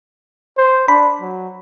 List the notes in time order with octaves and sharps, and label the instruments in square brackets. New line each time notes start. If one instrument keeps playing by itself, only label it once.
[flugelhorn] C5
[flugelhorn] D4 [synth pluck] B5
[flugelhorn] F#3